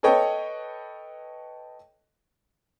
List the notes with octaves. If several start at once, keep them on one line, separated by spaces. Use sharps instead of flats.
A4 B4 C#5 D#5 G5